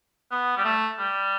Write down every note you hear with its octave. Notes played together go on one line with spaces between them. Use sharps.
B3
G3
A3
G3